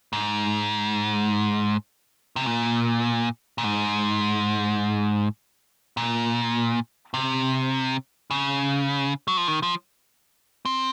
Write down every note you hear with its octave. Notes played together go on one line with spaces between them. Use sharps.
G#2
C3
A#2
A#2
G#2
A#2
C3
C#3
F#3
F3
D#3
F3
C4